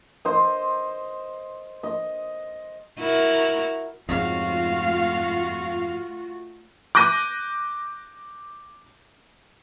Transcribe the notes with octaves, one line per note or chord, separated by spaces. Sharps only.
C5 D#5
D#5
E4 F#4 A#4
F2 G#2 C#3 A3 F4 F#4 F5
D6 F#6 G6 A#6 D#7